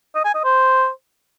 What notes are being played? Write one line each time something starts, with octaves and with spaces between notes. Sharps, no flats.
D#5
G#5
D#5
C5